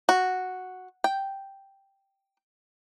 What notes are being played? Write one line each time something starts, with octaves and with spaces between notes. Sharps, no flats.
F#4
G5